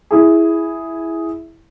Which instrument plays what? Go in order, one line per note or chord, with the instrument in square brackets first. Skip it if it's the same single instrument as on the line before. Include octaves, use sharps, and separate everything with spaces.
[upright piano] E4 G#4